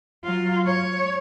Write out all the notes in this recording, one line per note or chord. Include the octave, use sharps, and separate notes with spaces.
F#3 F4
C#5